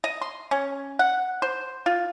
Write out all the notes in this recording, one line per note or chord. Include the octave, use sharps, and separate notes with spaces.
D#5
C6
C#4
F#5
C5
F4